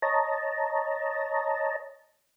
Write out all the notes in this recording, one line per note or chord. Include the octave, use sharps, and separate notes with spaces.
C#5 D#5 A5 A#5